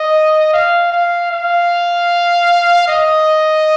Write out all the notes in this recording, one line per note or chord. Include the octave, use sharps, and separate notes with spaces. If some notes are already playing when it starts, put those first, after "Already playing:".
Already playing: D#5
F5
F5
F5
D#5